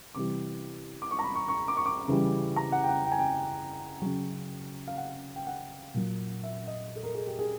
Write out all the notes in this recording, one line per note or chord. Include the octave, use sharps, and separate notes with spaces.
C3 E3 G3 D6
D6
C#6
A#5
B5
C#6
C#6
D6
C#6
D6
C#3 E3 G3
A#5
F#5
G5
F#5
G5
G#5
G5
C#3 F#3
F5
F#5
G5
F#5
A#2 F#3
E5
D#5
A4
A#4
G#4
G4
G#4